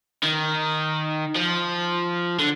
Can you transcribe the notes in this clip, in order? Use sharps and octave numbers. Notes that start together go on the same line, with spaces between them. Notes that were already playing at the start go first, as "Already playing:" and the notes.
D#3
F3
D3